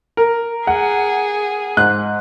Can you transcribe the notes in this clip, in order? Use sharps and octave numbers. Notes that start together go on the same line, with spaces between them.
A#4
G#4 F#5
G#2 F#6